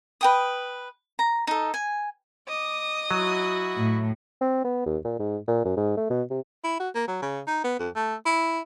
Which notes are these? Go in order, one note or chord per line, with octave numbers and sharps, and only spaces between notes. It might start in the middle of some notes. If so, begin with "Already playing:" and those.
B4 G5 D#6
A#5
D#4 A4
G#5
D#5 D6 D#6
F#3 E4 F#4
A2
C4
B3
D#2
A#2
G#2
A#2
F#2
G#2
A3
B2
C3
E4
F#4
A#3
F#3
C#3
D#4
B3
F2
A3
E4